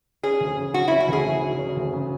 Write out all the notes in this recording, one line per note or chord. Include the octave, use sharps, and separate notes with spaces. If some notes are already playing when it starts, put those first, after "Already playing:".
C#4 G#4
D2
C#3
F#3 F#4
C#4 E4
F#4
D2 G#4
C#3
F#3
C#4
D2
C#3